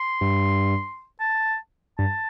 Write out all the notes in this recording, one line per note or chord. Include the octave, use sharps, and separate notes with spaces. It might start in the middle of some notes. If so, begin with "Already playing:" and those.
Already playing: C6
G2
A5
G2 A5